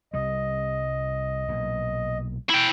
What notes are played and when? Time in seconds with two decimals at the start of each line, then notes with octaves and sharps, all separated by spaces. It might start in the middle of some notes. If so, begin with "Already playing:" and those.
0.14 C2 G3 D#5
1.48 B1 A#2
2.49 E4 G5